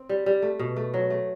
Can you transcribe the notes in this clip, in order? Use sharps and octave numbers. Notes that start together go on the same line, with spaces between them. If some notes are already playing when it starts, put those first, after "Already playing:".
Already playing: C4
G3
G3
A3
B2
A3
F#3
A3